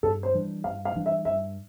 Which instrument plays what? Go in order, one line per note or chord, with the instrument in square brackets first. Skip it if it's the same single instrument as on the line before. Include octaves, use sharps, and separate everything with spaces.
[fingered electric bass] G2 [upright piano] A4
[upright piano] C5
[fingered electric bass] E3 G3 D4
[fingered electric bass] G2 [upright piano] F5
[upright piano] F5
[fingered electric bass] E3 G3 D4
[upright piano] E5
[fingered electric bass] G2 [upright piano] E5